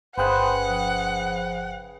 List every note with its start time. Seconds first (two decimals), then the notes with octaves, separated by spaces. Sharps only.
0.18 G1 C#3 G#4 B4 C5 F#5 G5 F#6
0.69 F3